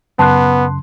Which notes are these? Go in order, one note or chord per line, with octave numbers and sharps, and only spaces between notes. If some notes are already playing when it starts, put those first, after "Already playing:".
F#2 C#3 B3 A5 C6 F#6